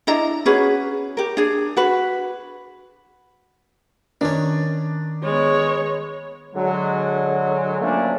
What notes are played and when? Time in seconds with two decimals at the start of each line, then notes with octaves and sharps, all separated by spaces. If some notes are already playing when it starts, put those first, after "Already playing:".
0.07 D4 E4 D#5 A#5
0.46 C#4 F#4 G#4 B4
1.17 G4 A#4
1.37 D4 G#4
1.77 F#4 B4
4.21 D#3 C#4 D4
5.24 G#3 B3 C#5
6.56 D3 F#3 G#3
7.81 F3 F#3 A3 A#3 C#4 D4